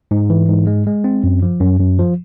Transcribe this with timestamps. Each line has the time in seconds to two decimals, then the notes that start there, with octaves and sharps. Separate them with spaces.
0.11 G#2
0.30 E3
0.49 G#2
0.67 G#3
0.87 G#3
1.04 C4
1.24 F#2
1.42 F3
1.61 F#2
1.79 F#2
1.99 F3